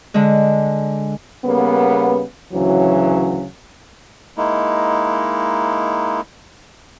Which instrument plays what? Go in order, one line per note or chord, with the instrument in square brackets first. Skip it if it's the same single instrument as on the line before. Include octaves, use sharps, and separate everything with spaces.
[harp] D3 G#3
[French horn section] C#3 G3 A#3 B3
D2 C#3 E3 F#3
[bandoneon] G#3 A#3 D#4 E4